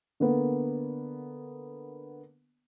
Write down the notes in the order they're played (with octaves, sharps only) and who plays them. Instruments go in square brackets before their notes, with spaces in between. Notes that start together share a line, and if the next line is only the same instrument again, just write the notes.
[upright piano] D3 A#3 B3